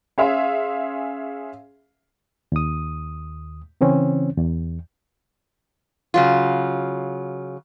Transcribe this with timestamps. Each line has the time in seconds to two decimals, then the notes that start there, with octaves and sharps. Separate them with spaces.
0.18 C#4 G#4 E5 F5 C6
2.52 D#2 D#6
3.81 C#3 E3 C4 C#4
4.37 E2
6.14 C#3 F#3 F4